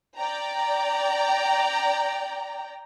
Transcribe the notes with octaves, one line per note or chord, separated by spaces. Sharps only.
D5 G5 A#5